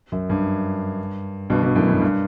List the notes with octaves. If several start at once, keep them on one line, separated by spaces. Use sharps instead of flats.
F#2
G2
G2 B2
G2 B2
F#2 A2
G2
G2